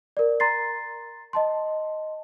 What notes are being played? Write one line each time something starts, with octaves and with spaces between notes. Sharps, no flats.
A#4 D5
A#5 C6 A6 C7
D#5 A5 C6